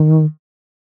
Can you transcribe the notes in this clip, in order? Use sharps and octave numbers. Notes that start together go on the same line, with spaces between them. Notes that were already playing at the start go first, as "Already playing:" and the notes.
Already playing: D#3